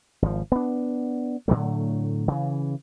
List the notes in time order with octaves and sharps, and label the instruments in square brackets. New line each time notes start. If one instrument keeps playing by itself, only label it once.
[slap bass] G#1 F3
B3 D4
A2 D3 F#3 A3
C#3 E3